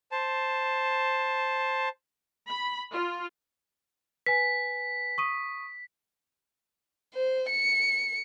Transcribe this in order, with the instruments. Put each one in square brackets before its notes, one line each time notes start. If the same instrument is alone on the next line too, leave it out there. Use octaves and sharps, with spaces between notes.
[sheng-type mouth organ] C5 A5
[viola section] B5
F4
[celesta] B4 G#5 [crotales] B6
[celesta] C#6 D#6 D#7
[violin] C5
C#7